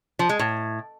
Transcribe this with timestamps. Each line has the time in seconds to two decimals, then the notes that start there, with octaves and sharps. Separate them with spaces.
0.19 F3
0.29 G#3
0.39 A2